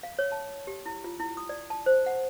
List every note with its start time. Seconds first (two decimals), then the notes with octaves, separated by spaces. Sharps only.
0.03 F5
0.19 C#5
0.32 A5
0.67 G4
0.86 E4
1.04 F4
1.20 E4
1.37 D#6
1.49 D5
1.70 A5
1.86 C5
2.06 F#5